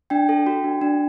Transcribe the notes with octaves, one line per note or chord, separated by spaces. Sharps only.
D4 G5
A4
F#4
D4
D4